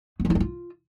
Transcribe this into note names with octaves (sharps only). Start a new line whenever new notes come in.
B3
F3
E4
D4
F4